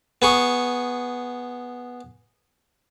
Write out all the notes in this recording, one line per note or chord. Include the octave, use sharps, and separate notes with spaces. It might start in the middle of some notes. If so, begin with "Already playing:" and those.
B3 G#4 C#6